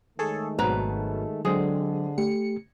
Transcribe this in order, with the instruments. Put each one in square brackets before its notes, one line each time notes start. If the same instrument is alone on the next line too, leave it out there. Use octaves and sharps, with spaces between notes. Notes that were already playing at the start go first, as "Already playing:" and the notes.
[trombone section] D#3 G#3 A3 [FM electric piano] G#4 A4 C#5
[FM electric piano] G#1 G#2 F#3 [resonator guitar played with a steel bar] B2 B4 A#5
[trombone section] D3 [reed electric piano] F#3 [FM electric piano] G#3 C4 [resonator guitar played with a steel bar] G#4
[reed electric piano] A3 G4 [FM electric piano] C#7